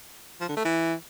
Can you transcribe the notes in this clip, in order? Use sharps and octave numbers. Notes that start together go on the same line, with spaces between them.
F3
D3
A3
E3